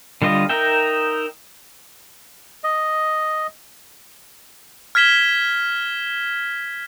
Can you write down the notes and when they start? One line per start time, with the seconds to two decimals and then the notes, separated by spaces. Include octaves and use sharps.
0.22 D3 G3 F4 D#5
0.49 D#4 A#4 E5 G5
2.64 D#5
4.95 F6 G#6 B6 E7 G7